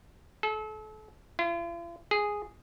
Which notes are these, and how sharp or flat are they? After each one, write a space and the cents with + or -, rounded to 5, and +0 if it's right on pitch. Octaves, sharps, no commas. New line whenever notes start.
A4 -35
F4 -45
G#4 -5